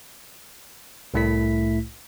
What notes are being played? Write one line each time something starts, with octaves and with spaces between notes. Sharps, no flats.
C2 A2 A3 E4 B6